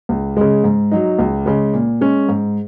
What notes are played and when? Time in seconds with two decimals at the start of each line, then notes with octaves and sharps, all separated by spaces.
0.09 C#2
0.37 C#3 G#3
0.64 G#2
0.91 F#3 D#4
1.19 C#2
1.46 C#3 G#3
1.73 A#2
2.01 G#3 C#4
2.29 G#2